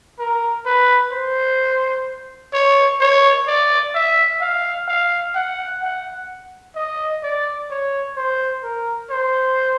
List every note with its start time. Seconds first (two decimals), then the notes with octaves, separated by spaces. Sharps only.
0.19 A#4
0.66 B4
1.12 C5
2.53 C#5
3.01 C#5
3.47 D5
3.95 E5
4.41 F5
4.88 F5
5.35 F#5
5.82 F#5
6.76 D#5
7.23 D5
7.70 C#5
8.16 C5
8.63 A#4
9.10 C5